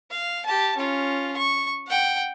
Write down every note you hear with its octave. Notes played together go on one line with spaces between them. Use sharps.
F5
G4 A5
C#4 F4
C#6
F#5 G5